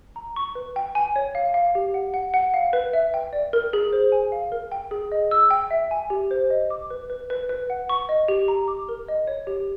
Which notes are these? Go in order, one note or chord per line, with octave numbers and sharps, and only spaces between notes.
A#5
C#6
B4
G5
G#5
C#5
F5
F5
G4
F#5
F#5
F#5
F5
B4
E5
G5
D5
A#4
G#4
C5
G#5
F5
A#4
G5
G#4
D#5
E6
G5
E5
G#5
G4
C5
D#5
D6
B4
B4
B4
B4
F#5
C#6
D#5
G4
A#5
D6
A#4
D#5
C#5
G4